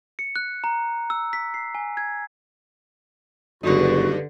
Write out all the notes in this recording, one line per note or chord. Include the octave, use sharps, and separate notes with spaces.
C#7
F#6
A#5
E6
B6
C7
G#5
G#6
F#1 G2 D3 D#4 F#4